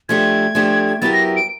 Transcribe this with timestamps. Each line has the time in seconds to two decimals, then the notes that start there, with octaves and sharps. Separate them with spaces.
0.09 F3 A3 D4 G4 G#6
0.55 F3 A3 D4 G4
1.01 F#3 B3 E4 G4 A#4 A6
1.13 A#6
1.36 D7